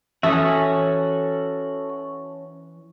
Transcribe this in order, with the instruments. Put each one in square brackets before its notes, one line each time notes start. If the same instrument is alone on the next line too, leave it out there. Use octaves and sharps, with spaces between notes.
[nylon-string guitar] E3 B4 [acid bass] C#4 [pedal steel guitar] F#4 A4 D#6 [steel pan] E5